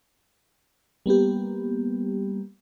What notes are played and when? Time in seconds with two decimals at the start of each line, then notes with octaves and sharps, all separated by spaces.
1.06 G3 A#3 B3 G4